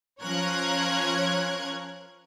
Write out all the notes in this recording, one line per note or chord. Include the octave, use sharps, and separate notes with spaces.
F3 C#4 A#4 C#5 F#6 G#6